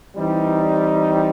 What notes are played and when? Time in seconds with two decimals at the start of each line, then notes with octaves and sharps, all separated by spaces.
0.16 E3 G3 C4 D#4